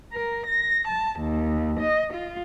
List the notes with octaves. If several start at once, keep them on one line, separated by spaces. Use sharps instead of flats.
A#4
A#6
A5
D#2
D#5
F4